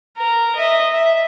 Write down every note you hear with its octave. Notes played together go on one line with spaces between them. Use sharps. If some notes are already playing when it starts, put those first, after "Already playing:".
A#4
D#5 E5
E5